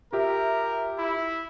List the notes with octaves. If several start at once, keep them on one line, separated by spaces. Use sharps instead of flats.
F4 G4 A#4 E5
E4